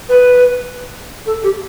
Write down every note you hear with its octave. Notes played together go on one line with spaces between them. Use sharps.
B4
A4
G4